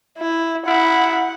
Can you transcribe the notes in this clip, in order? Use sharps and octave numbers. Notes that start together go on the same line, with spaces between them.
E4
E4 F#5